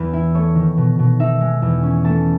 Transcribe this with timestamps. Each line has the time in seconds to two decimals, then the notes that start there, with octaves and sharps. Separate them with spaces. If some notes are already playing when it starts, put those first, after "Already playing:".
Already playing: E2 B4
0.13 E4
0.34 A3 C#5
0.55 D#3
0.77 B2
0.99 B2
1.20 D#4 E5
1.41 G#3
1.62 E2
1.83 C#4
2.05 A3 A5